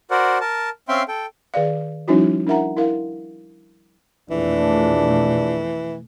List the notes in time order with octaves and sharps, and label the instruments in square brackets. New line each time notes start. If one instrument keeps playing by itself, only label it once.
[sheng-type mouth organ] F#4 A#4 C5 D5 F#5
A#4 A5
C4 C#4 E5 F5 G5 C6
A4 G5
[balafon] D#3 G#4 D5 F5
F3 G3 C#4 D#4 E4 F#4
D4 E4 A#4 E5 F#5 A#5
E4 A#4 F5
[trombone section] A#1 D4 [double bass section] F2 B2 A3 [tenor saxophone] E3